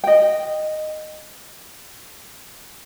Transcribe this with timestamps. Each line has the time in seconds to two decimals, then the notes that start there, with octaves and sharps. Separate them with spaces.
0.04 D#5 G5